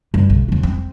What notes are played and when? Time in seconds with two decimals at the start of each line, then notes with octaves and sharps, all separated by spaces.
0.14 G2
0.30 B1
0.48 E1 D4
0.63 C4